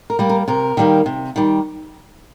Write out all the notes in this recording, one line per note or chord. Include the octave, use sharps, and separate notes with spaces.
A#4
G3 A#3
A#4
C3 A#4
D#3 G3 A#3
C3
D#3 G3